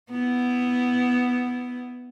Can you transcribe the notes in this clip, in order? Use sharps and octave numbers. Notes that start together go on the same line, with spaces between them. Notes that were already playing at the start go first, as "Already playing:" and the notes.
B3 E4